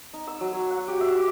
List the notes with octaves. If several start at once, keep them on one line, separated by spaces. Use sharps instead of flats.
D#4
E6
F#3
C#5
F#5
G4
E5
D6